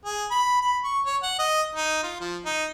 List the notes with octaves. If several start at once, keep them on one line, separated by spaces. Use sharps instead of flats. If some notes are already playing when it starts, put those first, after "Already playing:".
G#4
B5
B5
C#6
C#5
F#5
D#5
D#4
F4
F3
D#4